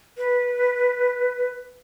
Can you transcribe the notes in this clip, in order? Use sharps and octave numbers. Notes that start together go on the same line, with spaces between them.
B4